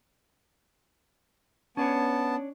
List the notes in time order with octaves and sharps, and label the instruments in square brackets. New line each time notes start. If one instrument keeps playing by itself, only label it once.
[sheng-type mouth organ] B3 A5 [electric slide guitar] C#4 D4 C#5